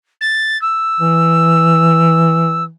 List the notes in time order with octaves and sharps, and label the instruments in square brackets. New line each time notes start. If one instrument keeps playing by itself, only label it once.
[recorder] A6
E6
[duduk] E3